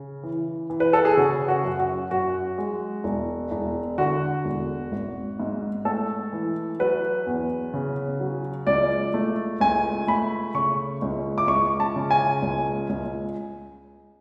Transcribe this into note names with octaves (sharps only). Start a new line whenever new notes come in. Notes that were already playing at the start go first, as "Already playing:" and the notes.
Already playing: C#3
E3
E3
B4
A4
G#4
C#3 F#4
F#4
F#2
F#4
F#2 F#4
G#3
E1
E1
D3 F#4
E1
G#1
G#2
A3 A4
E3
F#3 B4
E2
C#3
F#3
C#2 D5
A3
C#2 G#5
A3 B5
C#3 C#6
C#2
D6
C#2 C#6
A5
C#3
G#5
C#2
C#2